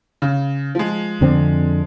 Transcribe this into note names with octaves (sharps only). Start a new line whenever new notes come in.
C#3
F3 G#3
F2 D3 C4